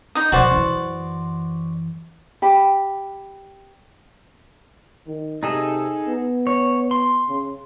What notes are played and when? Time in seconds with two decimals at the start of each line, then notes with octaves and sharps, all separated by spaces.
0.15 D#4 D#6
0.32 B2 F3 F#4 C5 D5
0.50 F#2 E3
2.42 G4 B5
5.07 D#3
5.43 C3 D#4 G#4 A4
6.08 B3
6.47 C#5
6.91 C6
7.29 C#3